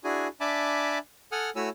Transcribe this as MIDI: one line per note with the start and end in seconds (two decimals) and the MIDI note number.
0.04 0.28 62
0.04 0.28 64
0.04 0.28 66
0.04 0.28 68
0.04 0.28 80
0.40 0.98 62
0.40 0.98 76
0.40 0.98 80
0.40 0.98 81
0.40 0.98 83
0.40 0.98 86
1.32 1.50 69
1.32 1.50 78
1.32 1.50 80
1.32 1.50 87
1.32 1.50 89
1.56 1.69 57
1.56 1.69 64
1.56 1.69 66
1.56 1.69 73
1.56 1.69 80
1.56 1.69 88